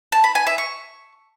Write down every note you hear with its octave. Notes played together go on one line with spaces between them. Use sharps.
A5
B5
G#5
E5
C#6